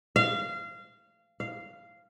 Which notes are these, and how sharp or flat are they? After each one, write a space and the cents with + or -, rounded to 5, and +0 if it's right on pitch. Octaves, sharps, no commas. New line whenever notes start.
F5 -25
F5 -10